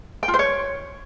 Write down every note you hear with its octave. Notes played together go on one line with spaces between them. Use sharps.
G5
F4
C5
C#5